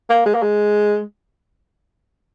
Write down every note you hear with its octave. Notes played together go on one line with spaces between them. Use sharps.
A#3
G#3
A#3
G#3